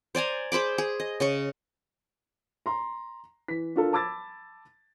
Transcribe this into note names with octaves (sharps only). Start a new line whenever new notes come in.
C5 D5 G#5 A#5
G#4 C5 B5 D6
G#4
D#5
C#3 D#5 C#6
A#5 C6
E3 B6
D4 F4 A4 A#4
A5 B5 D6 E6 G#6 A6